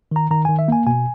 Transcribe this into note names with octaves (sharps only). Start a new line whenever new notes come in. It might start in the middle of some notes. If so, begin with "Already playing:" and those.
D#3 A#5
D#3 A#5
D#3 G#5
E5
A#3 G#5
B2 G#5